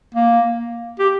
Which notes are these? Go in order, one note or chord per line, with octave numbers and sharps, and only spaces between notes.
A#3
G4